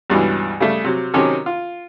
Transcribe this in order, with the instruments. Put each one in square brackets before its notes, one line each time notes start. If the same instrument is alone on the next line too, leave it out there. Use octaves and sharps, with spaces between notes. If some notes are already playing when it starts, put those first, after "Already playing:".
[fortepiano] C#2 G2 B2 E3
C#3 G3 A3
C3 F#3
C3 D#3 F#3 C#4 G4 A4
F4